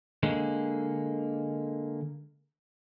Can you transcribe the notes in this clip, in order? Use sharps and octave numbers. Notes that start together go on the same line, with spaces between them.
D3 G#3 A#3